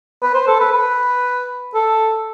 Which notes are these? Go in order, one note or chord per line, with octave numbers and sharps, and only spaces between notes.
B4
C5
A4
B4
B4
A4